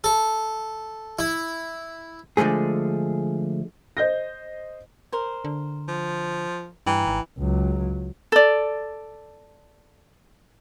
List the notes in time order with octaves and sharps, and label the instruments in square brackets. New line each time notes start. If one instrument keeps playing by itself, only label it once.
[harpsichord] A4
E4
[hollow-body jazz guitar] D3 F3 G#3 A3 G#4
[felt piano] C5 D#5 G6 A#6
[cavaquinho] A#4 C5
[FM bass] D3
[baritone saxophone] F3
[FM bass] G2 [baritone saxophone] E3 [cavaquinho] G5 A#5
[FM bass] G#1
[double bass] C#2 F#3
[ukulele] A4 D5